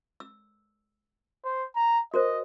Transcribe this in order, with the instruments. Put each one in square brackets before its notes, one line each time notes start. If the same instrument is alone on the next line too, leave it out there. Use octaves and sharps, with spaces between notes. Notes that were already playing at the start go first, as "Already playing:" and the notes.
[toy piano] E6
[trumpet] C5
A#5
[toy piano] F#4 A#4 C5 [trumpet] D#5